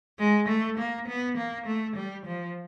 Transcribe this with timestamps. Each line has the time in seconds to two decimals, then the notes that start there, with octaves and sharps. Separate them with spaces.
0.19 G#3
0.48 A3
0.78 A#3
1.08 B3
1.37 A#3
1.66 A3
1.96 G3
2.26 F3